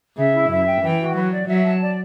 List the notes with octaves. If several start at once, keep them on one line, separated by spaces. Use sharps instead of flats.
C#3 E5
E4
F#2 E5
G5
E3 G5
F#4
F#3 B4
D5
F#3 E5
A5
D5